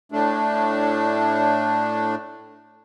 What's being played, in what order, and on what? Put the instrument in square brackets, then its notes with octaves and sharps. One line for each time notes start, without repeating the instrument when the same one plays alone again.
[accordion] A2 A3 D4